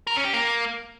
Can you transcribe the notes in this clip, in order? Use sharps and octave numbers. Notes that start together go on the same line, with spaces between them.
A#4
C#4
G4
A#3